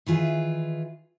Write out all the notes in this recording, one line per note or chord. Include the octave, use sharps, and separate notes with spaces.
D#3 E3 F4 G#4